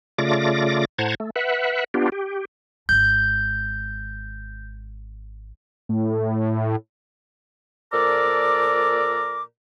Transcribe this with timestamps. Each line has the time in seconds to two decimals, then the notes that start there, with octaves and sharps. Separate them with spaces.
0.18 C#3 A3 F4 D5 D6 A#6
0.98 A2 C5 F#5 A5 A#5 G#6
1.20 A3
1.36 B4 E5 F#5
1.94 B3 D4 F4 G4
2.12 G4
2.89 G#1 G#3 G6
5.89 A2
7.92 A#2 F3 A4 A#4 D5 D6